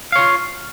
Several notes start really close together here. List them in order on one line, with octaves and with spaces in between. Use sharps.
F5 C#5 F4